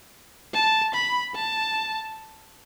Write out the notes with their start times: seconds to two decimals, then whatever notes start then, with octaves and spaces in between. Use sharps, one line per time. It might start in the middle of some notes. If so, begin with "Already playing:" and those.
0.54 A5
0.95 B5
1.36 A5